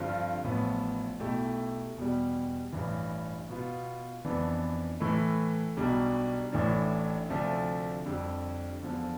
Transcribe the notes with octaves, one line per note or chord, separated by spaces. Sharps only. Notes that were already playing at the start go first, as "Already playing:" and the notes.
Already playing: G2 D3 F3 C4 F4
A1 A2 F3 B3
B1 B2 A3 E4 G4
E2 B2 G3
A1 G2 E3
B2 B3 F4
F2 E3 B3 D4
A2 E3 A3 E4
B1 B2 G3 D4
A1 A2 E3 A3 D4
D2 C3 F3 A3 D4
F2 D3 G3
E2 D3 F3